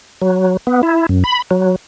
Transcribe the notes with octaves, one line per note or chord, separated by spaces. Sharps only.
F#3
B3
E4
F#2
B5
F#3